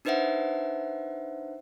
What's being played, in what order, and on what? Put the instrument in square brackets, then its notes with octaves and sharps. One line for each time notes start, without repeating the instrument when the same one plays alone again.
[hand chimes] D4 D#4 B4 C5 E5 F#5